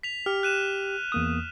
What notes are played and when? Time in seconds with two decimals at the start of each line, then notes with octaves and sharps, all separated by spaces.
0.03 B6 F7
0.26 G4 F6
0.43 F#6 D#7 E7
1.12 E2 A#3 D#6